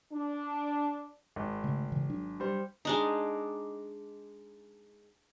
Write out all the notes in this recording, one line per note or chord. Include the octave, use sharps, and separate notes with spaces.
D4
G#1
C#3 A3
C#3 E3
F#3 D4
G3 C5
G#3 D4 D#4